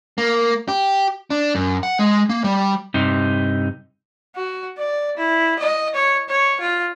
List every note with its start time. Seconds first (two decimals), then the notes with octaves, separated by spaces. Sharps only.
0.18 A#3
0.68 G4
1.30 D4
1.55 F#2
1.83 F#5
1.99 G#3
2.29 A#3
2.44 G3
2.94 G2 C3 D#4
4.35 F#4
4.78 D5
5.17 E4
5.59 D#5
5.95 C#5
6.29 C#5
6.60 F4